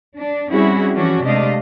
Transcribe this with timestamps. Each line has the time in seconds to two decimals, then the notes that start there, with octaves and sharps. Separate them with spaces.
0.17 D4
0.51 G3 C4 C#4 E4 F#4 G#4
0.93 E3 F3 C#4 D4 F#4
1.23 C3 G#3 A3 D4 D#5 F5